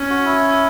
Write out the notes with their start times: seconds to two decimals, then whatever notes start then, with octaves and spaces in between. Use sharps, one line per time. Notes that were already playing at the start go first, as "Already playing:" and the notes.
Already playing: C#4
0.10 F#4
0.25 E4